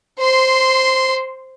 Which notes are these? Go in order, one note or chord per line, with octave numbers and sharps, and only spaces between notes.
C5 C6